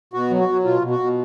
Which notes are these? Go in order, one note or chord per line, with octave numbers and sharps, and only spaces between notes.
B2 F#4
F#3
F#4
F#3
B2 F4
B2
F#4
B2